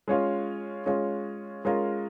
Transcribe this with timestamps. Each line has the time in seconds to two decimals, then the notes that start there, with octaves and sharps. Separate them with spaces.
0.08 G#3 C#4 F4
0.86 G#3 C#4 F4
1.65 G#3 C#4 F4 A#4